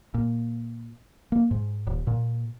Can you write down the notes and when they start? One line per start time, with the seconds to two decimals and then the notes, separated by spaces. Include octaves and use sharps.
0.14 A#2
1.32 A#3
1.51 G#2
1.87 D#1
2.07 A#2